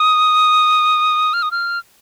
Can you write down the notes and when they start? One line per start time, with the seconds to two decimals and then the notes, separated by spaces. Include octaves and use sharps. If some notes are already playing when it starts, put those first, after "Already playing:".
Already playing: D#6
1.33 F6
1.42 D#6
1.51 F6